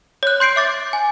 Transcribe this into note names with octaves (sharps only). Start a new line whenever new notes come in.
C#5 F#6
C6 G6 C7 D7
E5 D6 A6
G#5